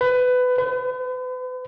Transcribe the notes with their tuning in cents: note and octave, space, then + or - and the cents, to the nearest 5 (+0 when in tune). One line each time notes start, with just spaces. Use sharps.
B4 +20
B4 +40